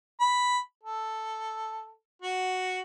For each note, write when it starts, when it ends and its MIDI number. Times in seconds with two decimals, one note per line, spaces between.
0.20 0.58 83
0.83 1.90 69
2.22 2.80 66